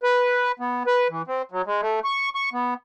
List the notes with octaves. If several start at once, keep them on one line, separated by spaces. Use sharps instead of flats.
B4
B3
B4
E3
C4
F#3
G#3
A3
C#6
C#6
B3